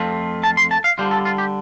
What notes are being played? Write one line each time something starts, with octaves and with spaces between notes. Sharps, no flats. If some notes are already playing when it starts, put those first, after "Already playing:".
Already playing: F2 A3 C4 F4
A5
C6
A5
F5
D3 G3 F4 C5
A4
F4
G4